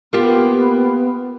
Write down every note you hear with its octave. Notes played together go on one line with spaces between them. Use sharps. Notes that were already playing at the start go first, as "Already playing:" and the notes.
A#3 B3 F4 G4